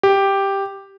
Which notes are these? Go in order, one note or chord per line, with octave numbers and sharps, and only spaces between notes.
G4